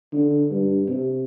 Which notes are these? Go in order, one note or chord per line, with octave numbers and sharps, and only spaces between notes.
D3
G2
C3